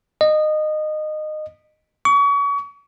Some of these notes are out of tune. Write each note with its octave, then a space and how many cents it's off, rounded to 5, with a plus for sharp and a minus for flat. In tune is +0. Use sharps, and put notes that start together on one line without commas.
D#5 -20
C#6 +35